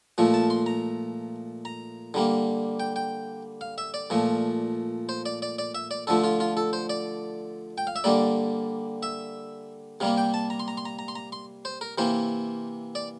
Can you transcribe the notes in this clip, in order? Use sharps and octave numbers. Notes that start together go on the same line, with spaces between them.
A#2 F3 A3
A5
C6
A#5
A#5
D3 G3 A#3
G5
G5
F5
E5
D5
A#2 F3 A3
C5
D5
D5
D5
E5
D5
D3 F3 A3 A4
F4
F4
A4
C5
D5
G5
F5
E5
D3 G3 A#3 D5
E5
C3 G3 A#3 F5
G5
A5
A#5
C6
A#5
C6
A#5
A#5
C6
A#5
C6
C5
A#4
C3 E3 A#3 C5
D5